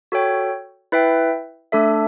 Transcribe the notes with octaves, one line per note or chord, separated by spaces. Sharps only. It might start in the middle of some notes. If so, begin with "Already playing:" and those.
F#4 A4 C#5 G5
E4 B4 E5 G5
A3 D4 A4 E5